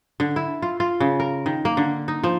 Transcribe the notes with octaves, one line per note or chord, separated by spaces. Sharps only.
D3
E4
F4
F4
C#3
A#4
D#3
A#3
D3
D#4
F3